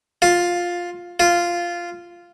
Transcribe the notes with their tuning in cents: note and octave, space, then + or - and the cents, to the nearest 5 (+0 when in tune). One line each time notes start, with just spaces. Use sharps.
F4 +5
F4 -10